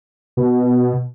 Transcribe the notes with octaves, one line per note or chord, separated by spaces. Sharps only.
B2